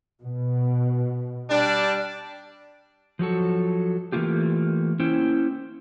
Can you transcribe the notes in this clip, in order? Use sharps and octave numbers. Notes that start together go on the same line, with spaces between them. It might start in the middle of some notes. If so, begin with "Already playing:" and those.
B2
G3 D4
F3 F#3 F#4 A4
E3 G3 A3 A#3 F4 G4
A#3 C#4 E4 C5 G5